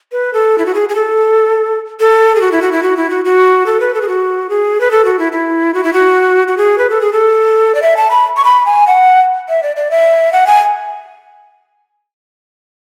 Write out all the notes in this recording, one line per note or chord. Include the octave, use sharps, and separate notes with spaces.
B4
A4
E4
F#4
G#4
G#4
A4
A4
G#4
F#4
E4
F#4
E4
F#4
E4
F#4
F#4
A4
B4
A4
G#4
F#4
G#4
B4
A4
F#4
E4
E4
F#4
E4
F#4
F#4
G#4
B4
A4
G#4
A4
D5
E5
A5
B5
C#6
B5
G#5
F#5
E5
D5
D5
E5
F#5
G#5